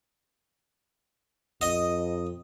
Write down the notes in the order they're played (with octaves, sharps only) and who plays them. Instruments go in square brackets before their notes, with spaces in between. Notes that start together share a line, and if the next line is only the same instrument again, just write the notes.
[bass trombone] F2 [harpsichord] D#5